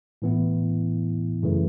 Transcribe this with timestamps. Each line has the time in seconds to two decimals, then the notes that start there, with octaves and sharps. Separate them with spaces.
0.22 A2 E3 B3 E4
1.43 F#2 C#3 E3 A3